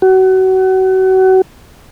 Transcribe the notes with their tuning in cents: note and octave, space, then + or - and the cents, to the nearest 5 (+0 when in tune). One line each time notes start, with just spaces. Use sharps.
F#4 +30